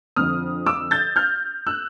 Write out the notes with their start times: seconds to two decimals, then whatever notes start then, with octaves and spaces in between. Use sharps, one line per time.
0.16 F2 D3 F3 D#6 F6
0.66 D6 E6
0.91 G6 A6
1.16 F6 G6
1.67 E6 F#6